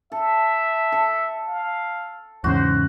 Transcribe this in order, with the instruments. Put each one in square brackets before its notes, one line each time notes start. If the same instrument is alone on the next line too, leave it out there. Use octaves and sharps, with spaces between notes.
[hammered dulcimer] A4 [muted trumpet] E5
[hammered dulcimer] A4
[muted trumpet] F5
[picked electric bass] E2 G#2 C#3 [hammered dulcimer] F#4 [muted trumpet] C5